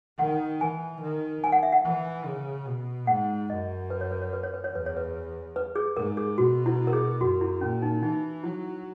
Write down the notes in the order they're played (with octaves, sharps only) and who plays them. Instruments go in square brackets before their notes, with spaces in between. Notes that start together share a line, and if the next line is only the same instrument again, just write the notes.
[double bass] D#3 [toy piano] F#5
[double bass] E3 [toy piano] G#5
[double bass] D#3
[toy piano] G#5
F#5
E5
F#5
[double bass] E3
C#3
B2
[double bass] G#2 [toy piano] F#5
[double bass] F#2 [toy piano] D#5
[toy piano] B4
C#5
B4
C#5
B4
C#5
B4
C#5
[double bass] E2 [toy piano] B4
[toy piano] C#5
B4
B4
G#4
[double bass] G#2 [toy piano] A#4
[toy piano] G#4
[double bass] B2 [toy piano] F#4
[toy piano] E4
A#4
G#4
[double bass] F#2 [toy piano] F#4
[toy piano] E4
[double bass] A#2 [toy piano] C#4
[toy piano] D#4
[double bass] E3 [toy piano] D#4
[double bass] F#3 [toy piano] E4